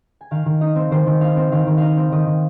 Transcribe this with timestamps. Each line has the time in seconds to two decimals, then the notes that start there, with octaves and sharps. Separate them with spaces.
0.21 G#5
0.31 D#3 F5
0.46 D#3
0.61 D#4 D#5
0.76 C4
0.91 D#3 C5
1.06 D#3
1.21 D#4 F5
1.36 C4
1.52 D#3 F5
1.67 D#3
1.77 D#4 D#5 F5
1.97 C4
2.12 D#3 D#5
2.27 D#3